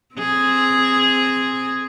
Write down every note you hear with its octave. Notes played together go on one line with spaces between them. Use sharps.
C4 G#4